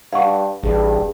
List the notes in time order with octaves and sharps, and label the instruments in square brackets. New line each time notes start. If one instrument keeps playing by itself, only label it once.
[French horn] G2 [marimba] F5 F#5 C#6
[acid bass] A1 [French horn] G2 [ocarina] G#4